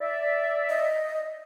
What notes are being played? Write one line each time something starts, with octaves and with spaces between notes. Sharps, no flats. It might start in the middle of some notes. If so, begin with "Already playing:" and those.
D5 E5
D#5